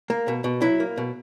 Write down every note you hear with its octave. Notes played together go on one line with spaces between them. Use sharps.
A#3
B2
B2
F#3 E4
A#3
B2